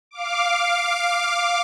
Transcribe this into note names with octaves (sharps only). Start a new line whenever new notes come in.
F5 D6